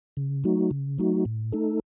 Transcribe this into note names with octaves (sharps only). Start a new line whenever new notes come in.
C#3
F#3 A3 D#4 F#4
C#3
F#3 A3 D#4 F#4
A2
A3 D#4 A4